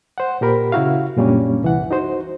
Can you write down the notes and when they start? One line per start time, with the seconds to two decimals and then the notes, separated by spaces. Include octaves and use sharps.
0.18 C5 F#5
0.41 A#2 G4 A#4 B5
0.72 C#3 E4 F#4 F5
1.17 F#2 A#2 G3 A#3 C#4 D4
1.62 C2 E3 F#5
1.91 D#4 F#4 C5